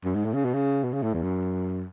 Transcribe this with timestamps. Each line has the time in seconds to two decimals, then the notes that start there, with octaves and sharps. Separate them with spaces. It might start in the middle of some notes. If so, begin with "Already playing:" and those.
0.05 F#2
0.15 G#2
0.25 A2
0.34 C#3
0.45 B2
0.54 C#3
0.84 B2
0.93 C#3
1.03 A2
1.14 E2
1.23 F#2